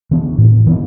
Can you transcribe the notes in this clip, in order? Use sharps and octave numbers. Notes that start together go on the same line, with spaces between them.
E3 B3 D4
A2
E3 B3 D4